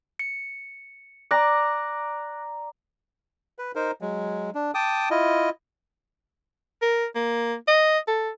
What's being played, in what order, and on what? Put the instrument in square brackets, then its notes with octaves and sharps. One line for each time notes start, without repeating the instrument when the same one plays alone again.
[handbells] C#7
[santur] D5 A#5 [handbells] D6 F#6 A#6
[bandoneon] B4
D#4 A#4 C5
F#3 G#3
D4
G5 A5 D6 D#6
E4 F4 D#5
[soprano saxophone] A#4
A#3
D#5
A4